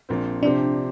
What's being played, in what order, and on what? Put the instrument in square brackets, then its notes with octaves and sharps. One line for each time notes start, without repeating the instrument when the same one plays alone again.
[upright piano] A#1 A#2 F3 C4
[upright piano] C3 F3 C4 G4 C5 [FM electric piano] D4